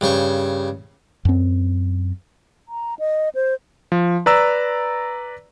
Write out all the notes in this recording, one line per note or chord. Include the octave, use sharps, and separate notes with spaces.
G2 C#3 C5 C#6
F#2 C4
A#5
D#5
C5
F3
B4 D5 A#5 E6